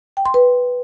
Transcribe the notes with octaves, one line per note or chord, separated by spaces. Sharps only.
G5
C6
B4